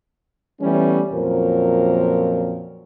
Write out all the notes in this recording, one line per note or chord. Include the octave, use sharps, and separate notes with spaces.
E3 G3 A3 B3 C#4
F2 A#2 F#3 C#4 A#4 C5